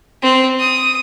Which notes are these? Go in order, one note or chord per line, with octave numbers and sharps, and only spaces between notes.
C4
D#6